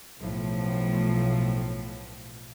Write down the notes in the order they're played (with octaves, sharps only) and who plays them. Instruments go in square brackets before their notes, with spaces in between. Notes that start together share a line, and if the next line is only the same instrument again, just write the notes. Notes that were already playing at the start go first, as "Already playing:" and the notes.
[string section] B1 A2 F3